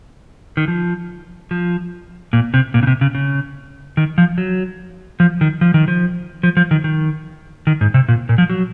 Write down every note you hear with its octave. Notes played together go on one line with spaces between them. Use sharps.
D#3
F3
F3
A#2
C3
A#2
C#3
C3
C#3
C#3
D#3
F3
F#3
F3
D#3
F3
D#3
F3
F3
F3
D#3
D#3
D#3
G#2
C3
A#2
A#2
F3
F#3